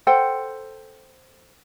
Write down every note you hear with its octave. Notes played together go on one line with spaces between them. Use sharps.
A4 C5 F#5 G5